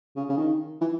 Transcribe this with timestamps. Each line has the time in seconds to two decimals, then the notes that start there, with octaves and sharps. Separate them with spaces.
0.16 C#3
0.29 C#3
0.37 D#3
0.81 E3